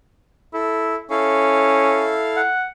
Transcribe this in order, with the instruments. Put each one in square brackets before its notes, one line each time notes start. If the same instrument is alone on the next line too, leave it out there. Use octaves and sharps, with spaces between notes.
[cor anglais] E4 [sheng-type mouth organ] A4
[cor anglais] C#4 [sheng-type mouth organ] E4 A4 F5
[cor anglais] F#5